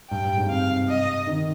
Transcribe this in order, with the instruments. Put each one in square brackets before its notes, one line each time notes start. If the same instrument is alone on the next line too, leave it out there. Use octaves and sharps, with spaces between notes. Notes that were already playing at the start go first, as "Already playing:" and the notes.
[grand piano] G2 [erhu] G5
[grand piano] G2
G#2
[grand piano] C3 [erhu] F5
[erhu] D#5
[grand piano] D#3